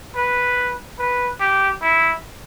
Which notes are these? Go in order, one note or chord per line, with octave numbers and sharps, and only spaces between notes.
B4
B4
G4
E4